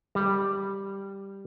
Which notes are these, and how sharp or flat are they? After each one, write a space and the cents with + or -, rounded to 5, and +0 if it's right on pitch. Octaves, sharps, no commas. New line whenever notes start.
G3 +0 A#5 -30